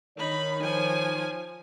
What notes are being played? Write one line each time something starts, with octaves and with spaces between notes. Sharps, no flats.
D#3 D#4 C#5 B5
F3 G#5